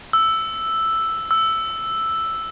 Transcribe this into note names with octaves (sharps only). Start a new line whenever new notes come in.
E6
E6